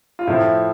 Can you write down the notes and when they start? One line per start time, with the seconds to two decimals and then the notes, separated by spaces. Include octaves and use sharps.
0.19 F4
0.27 A2 F3 E4